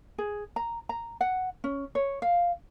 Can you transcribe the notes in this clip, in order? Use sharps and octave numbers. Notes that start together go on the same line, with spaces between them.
G#4
A#5
A#5
F#5
C#4
C#5
F5